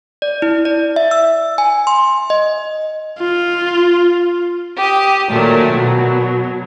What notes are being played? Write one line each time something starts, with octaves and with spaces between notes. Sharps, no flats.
D5
E4
D5
E5
E6
G#5
C6
D#5
F4
G4 D#6
A#2 D#3 F#3 A3 A#4
B2 F#3